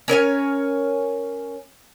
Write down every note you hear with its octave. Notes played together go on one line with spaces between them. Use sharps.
C#4 A#4 C#5 G#5